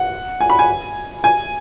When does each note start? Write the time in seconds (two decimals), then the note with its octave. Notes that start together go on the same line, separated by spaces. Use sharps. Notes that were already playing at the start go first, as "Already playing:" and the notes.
Already playing: F#5
0.40 G#5
0.50 B5
0.59 G#5
1.24 G#5